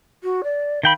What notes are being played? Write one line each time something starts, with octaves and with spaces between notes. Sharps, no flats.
F#4
D5
D#3 F5 G5 B5